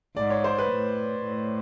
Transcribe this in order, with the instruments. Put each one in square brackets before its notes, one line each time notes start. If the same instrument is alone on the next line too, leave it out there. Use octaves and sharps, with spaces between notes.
[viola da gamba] G#2 [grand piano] D5
[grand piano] C#5
C5
B4
[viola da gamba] A2
A2